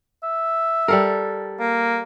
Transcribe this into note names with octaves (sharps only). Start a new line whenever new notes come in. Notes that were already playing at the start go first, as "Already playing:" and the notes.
E5
G3 A4 A#4
A#3